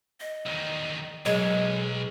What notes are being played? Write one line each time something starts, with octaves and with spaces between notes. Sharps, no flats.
D#5
E2 D#3
B1 F#3 G#3 A#4